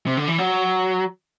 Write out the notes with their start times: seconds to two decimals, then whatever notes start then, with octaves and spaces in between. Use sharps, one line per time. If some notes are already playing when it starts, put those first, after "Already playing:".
0.07 C3
0.17 D3
0.28 E3
0.38 F#3